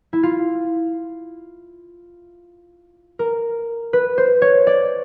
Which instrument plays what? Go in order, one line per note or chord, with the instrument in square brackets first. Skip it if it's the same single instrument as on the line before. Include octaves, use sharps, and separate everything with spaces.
[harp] E4
F4
A#4
B4
C5
C#5
D5